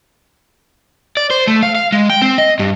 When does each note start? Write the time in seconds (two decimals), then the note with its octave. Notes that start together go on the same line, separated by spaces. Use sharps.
1.17 D5
1.30 C5
1.47 A3
1.63 F5
1.75 F5
1.92 G#3
2.10 G5
2.22 C4
2.38 D#5
2.59 G2